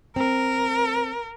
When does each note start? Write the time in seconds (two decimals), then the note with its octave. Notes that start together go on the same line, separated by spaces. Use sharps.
0.16 C4 A#4